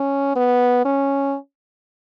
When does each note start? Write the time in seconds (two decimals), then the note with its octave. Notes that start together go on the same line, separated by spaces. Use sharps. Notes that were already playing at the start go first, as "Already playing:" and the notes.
Already playing: C#4
0.36 B3
0.85 C#4